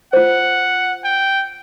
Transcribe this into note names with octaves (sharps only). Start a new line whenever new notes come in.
F4 C5 F#5
G5